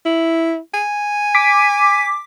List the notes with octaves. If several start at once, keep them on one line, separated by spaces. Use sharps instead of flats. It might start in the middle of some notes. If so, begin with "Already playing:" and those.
E4
G#5
D6 B6